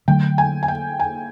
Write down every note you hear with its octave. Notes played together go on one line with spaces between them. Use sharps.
D3 F#3 A3 G5
G#5
G#5
G5
G#5